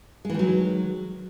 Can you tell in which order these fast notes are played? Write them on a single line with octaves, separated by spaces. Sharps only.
G#3 E3 D#3 F#3